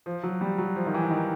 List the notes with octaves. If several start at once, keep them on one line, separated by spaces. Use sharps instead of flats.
F3
F#3
G3
F#3
F3
D#3
E3
D#3